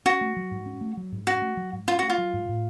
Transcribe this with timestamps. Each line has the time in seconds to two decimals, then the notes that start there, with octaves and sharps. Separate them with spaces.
0.06 C#4 F#4
0.21 A3
0.37 F#3
0.51 G#2
0.66 C#4
0.81 A3
0.97 F#3
1.12 G#2
1.27 C#4 F#4
1.42 A3
1.57 F#3
1.73 G#2
1.88 C#4 F4
1.99 A3 F#4
2.10 F4
2.18 F#3
2.34 G#2
2.49 A2